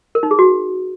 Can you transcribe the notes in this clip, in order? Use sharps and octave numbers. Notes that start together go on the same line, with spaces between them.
A#4
D#4
G#4
F#4